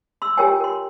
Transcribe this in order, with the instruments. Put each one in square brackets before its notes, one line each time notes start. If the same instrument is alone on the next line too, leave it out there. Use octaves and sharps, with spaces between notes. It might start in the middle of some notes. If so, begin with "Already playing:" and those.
[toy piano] C6 E6
F4 G4 A#4 C#5 G5 G#5
A#4 C6